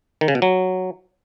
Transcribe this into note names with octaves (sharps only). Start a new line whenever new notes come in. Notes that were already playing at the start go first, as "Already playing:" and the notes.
D#3
C#3
B2
F#3